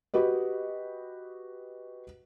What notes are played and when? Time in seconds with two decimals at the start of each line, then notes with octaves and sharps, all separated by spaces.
0.14 F#4 G4 B4 D#5